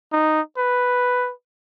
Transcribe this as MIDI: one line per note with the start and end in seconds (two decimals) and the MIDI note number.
0.12 0.41 63
0.57 1.32 71